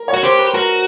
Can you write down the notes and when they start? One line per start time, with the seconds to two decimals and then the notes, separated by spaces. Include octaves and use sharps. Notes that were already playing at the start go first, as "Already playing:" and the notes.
Already playing: A#4
0.08 C#5
0.14 F#4
0.23 G4 C5
0.39 B4
0.54 F#4 A#4